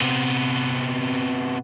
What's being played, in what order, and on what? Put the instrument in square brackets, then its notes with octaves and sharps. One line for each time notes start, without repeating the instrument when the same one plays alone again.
[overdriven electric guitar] C3 B3